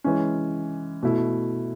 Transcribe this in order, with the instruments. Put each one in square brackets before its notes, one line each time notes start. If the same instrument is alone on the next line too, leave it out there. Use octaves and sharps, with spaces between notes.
[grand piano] E3 G#3 C#4
B2 A3 E4